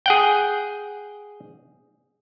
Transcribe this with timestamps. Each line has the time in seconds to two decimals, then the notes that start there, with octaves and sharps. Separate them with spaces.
0.06 G#4 F#5 G5